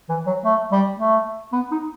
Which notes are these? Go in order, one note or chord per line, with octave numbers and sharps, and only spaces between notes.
E3
F#3
A3
G3
A3
B3
D#4